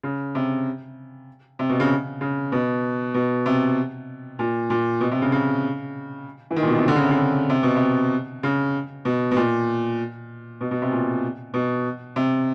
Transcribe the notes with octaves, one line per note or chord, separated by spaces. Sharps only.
C#3
C3
C3
B2
C#3
C#3
B2
B2
C3
A#2
A#2
B2
C3
C#3
C#3
E3
D#3
A#2
B2
C3
D3
C#3
C3
C#3
C3
B2
C3
C#3
B2
B2
A#2
B2
B2
C3
A#2
B2
C3